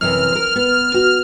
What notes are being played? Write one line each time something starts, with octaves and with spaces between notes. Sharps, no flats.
F#2 C3 E3 F6
A#4 C5
B3
F#4